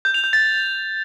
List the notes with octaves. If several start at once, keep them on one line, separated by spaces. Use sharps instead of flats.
G6
F7
G6
A6